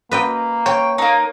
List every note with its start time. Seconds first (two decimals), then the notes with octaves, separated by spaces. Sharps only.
0.11 A#3 B4 D#5 G5
0.66 C#5 G5
0.98 A#3 D#4